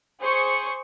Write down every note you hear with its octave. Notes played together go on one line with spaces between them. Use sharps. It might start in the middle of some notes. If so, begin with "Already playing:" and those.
G#4 C5 C#6 C#7